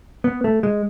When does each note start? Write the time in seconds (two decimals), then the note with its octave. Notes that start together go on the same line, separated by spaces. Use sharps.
0.24 B3
0.44 A3
0.63 G#3